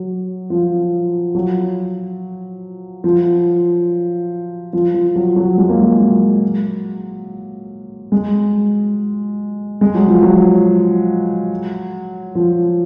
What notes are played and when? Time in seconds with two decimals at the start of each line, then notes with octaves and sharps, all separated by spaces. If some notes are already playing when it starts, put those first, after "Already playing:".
Already playing: F#3
0.50 F3
1.35 F#3
3.04 F3
4.73 F3
4.94 F3
5.16 F#3
5.36 F#3
5.58 G#3
5.69 A#3
5.81 G#3
6.00 F#3
8.12 G#3
9.81 G#3
9.95 F#3
10.08 F3
10.23 F#3
12.35 F3